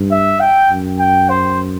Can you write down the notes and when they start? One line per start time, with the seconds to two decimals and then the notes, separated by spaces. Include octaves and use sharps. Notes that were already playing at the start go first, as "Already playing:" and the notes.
Already playing: G2
0.11 E5
0.40 G5
0.70 F#2
1.00 G5
1.30 C5